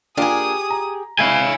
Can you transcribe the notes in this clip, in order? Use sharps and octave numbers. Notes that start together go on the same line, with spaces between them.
A#3 D4 F4 G4 G#4 D#6
A#5
G#3 E4 F5 G#5